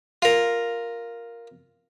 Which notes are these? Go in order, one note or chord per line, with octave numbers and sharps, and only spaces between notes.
F4 A#4